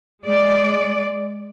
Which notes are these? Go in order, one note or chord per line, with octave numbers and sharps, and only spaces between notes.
G#3 D5